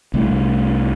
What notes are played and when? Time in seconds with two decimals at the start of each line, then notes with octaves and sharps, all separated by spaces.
0.14 C2 A3